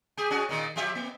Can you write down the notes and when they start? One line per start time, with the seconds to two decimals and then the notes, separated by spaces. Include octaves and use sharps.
0.17 G4 G#4
0.31 C#4 F#4 G#4
0.49 A#2 D#3
0.76 F3 G4 E5
0.95 A#3